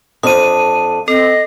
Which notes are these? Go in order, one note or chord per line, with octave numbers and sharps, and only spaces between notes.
F2 D4 D#6 D#7
C4 A4 D#5